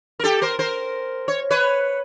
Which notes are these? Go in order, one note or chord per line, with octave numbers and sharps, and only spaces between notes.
A#4
G4 A4
A#4 C5
A#4 C5
C#5
B4 C#5